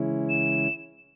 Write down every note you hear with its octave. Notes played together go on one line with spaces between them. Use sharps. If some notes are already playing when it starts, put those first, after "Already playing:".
Already playing: C#3 E3 G#3 C#4 E4
E7